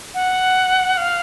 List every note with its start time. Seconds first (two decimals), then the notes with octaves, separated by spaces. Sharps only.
0.14 F#5
0.97 F5